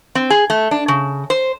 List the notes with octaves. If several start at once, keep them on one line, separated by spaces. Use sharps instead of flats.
C4
G#4
A3
D4
C#3
C5